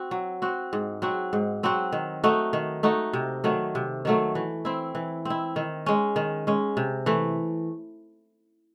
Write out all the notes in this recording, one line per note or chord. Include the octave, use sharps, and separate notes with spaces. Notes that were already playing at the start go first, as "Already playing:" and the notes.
Already playing: C4 F#4
F#3
C4 F#4
G#2
F#3 C4 F#4
G#2
F#3 C4 F#4
D#3
A3 D#4 F#4
D#3
A3 D#4 F#4
C3
D#3 F#3 A3
C3
D#3 F#3 A3
E3
C4 E4
E3
C4 E4
D#3
G#3 C#4
D#3
G#3 C#4
C3
E3 A3